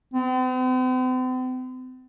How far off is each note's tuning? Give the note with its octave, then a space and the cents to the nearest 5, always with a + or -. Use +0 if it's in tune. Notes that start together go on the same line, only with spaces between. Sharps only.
C4 -45